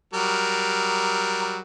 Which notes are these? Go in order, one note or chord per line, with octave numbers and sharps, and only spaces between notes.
F#3 G3 A#4